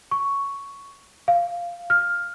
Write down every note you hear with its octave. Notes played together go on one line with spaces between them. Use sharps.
C#6
F5
F6